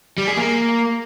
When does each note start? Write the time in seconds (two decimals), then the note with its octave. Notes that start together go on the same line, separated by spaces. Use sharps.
0.18 G3
0.27 G#4
0.37 A#3